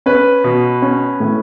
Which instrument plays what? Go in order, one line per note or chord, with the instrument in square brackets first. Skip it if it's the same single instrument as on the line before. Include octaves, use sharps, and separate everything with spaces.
[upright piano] C#4 B4
B2
C#4
A2